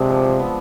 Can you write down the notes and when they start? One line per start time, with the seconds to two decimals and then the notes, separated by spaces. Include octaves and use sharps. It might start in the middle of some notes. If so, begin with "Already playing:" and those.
Already playing: C3 G#3 C4 D4 F4
0.09 F3
0.24 F3
0.40 B3